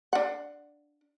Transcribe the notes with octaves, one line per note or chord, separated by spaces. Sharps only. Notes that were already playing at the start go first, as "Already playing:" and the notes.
D4 F#5